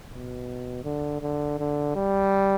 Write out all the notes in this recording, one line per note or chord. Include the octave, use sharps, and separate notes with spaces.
B2
D3
D3
D3
G3